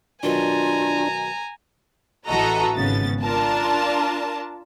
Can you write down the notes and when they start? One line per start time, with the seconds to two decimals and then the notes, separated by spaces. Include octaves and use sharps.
0.23 B2 D#3 F#3 D4 F4 G#5 A#5
2.26 A1 E3 F#4 A4 D#5 A#5
2.74 G#1 C#3 B3 A6
3.22 D4 F4 A#4 A5